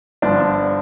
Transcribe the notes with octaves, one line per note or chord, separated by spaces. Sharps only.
G1 G2 D3 F3 D4